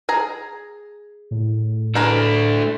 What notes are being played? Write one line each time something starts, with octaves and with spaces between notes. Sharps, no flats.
G#4 A#5
A2
A3 D4 G#4 A#4 B4